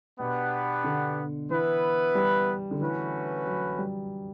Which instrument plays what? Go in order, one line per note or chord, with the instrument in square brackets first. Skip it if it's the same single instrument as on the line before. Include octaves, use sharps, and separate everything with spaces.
[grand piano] B2 [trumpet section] B3 D4 G4 B4 F#5
[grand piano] D3
[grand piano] E3 [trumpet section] B3 E4 B4
[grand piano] G3
D3
[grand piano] E3 [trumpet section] A3 C#4 F#4 B4
[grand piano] F#3
G3